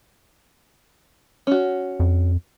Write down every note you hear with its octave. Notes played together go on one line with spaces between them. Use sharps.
C#4 F#4
F2